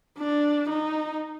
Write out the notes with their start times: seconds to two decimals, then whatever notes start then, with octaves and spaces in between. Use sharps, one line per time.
0.18 D4
0.69 D#4